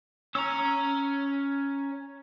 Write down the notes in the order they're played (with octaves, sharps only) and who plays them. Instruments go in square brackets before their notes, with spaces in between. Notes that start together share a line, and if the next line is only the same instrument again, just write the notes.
[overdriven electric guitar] C#4 C#5 [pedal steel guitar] A#5 E6